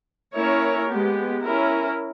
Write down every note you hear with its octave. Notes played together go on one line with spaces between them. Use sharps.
A#3 C#4 E4 A#4 C#5
G#3 B3 G4
C#4 E4 A#4